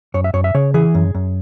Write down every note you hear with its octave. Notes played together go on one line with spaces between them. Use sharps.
F#2 C#5
E5
F#2 C#5
E5
C#3 C#5
E3 G#4
F#2
F#2